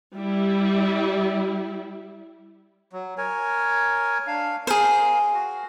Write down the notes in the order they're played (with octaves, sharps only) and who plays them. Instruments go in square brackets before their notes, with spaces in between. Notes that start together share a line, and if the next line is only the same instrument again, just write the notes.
[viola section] G3 E4
[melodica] F#3
A#4 C#5 G#5
D4 F5
[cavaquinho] G#4 C5 [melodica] A#4 F5
[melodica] F#4